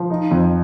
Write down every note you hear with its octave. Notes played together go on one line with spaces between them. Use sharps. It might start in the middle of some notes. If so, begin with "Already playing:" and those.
Already playing: F3
D#4
F2